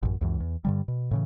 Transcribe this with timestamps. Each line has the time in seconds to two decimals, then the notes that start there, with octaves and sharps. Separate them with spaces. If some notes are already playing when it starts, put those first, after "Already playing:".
0.03 A1 F#2
0.21 C#2 F#2 E3
0.40 E2
0.65 G2 D3 G3
0.88 B2
1.11 A2 C#3 E3